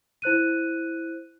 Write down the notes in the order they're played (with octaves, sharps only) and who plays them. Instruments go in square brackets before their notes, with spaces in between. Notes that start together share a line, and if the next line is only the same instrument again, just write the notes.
[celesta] E4 C5 F#6 D#7